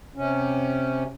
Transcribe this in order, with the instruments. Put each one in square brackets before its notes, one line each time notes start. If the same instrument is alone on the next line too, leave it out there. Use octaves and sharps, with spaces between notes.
[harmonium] C3 C#4